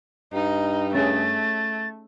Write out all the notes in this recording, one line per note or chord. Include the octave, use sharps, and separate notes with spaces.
G2 D#4
A3 C#4 G#4 A6